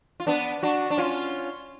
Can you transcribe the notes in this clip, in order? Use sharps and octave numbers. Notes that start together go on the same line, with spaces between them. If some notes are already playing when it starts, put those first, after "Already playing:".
F4
B3 D4
D4 F#4
D4
C#4 F4